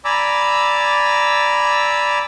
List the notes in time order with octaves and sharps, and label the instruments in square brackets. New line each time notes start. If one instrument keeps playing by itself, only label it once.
[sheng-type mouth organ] D5 G#5 A#5 B5 D6 E6